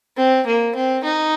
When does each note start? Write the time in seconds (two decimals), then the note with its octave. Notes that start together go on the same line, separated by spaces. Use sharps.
0.17 C4
0.47 A#3
0.75 C4
1.04 D#4